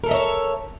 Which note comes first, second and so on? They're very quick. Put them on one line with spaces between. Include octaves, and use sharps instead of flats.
A#4 A4 E5 D#5 C#5